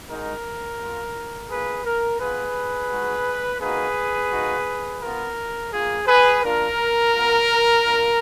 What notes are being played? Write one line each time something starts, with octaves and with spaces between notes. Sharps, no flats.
G#3 D#4 F#4 A#4
A#3 F4
A#3 F4 G#4 B4
A#4
B3 F4 G#4 B4
G#3 D#4 F#4
A#3 D#4 F#4 G#4 B4
A#3 D#4 F#4
B3 F4 A#4
A#3 F4 G#4
G#4 B4
A#3 D4 F4 A#4
B3 F4
A#3 D4 F4